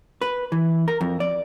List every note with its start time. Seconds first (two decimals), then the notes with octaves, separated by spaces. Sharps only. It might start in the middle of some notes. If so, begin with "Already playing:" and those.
0.21 B4
0.52 E3
0.88 A#4
1.01 F2
1.20 D5